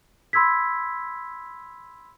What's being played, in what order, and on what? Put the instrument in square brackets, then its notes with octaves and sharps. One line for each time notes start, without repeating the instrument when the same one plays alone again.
[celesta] B5 C6 E6 G#6 B6